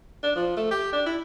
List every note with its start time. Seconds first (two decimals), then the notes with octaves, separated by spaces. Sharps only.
0.23 D4
0.35 F3
0.57 A3
0.71 G4
0.92 D4
1.06 E4